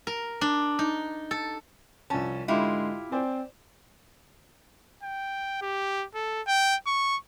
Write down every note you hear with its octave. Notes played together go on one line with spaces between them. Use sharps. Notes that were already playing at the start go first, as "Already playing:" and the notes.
A#4
D4
D#4
A4
C2 F3 C#4 A5
G#2 D3 G#3 E4 F4 G4
C4 C5 D5 G#5
G5
G4
A4
G5
C#6